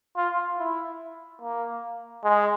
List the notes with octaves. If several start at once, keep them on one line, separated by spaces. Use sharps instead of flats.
F4
E4
A#3
G#3